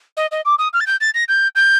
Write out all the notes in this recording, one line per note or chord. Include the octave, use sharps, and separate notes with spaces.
D#5
D#5
D6
D#6
F6
A6
G6
A6
A#6
G6
G6